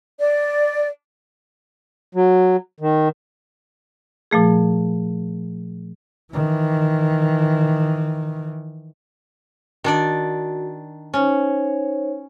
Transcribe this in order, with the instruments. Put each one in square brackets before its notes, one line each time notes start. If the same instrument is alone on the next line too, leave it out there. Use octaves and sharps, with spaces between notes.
[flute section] D5
[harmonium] F#3
D#3
[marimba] A#2 F3 A3 G#4
[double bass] D#3 E3
[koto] D#3 D4 D5 [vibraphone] F#4
[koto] C#4 [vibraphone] D#4 C5 C#5